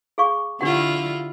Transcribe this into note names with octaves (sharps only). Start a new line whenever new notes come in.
G#4 F5 C#6
D3 D4 E4 F4 G4 F#5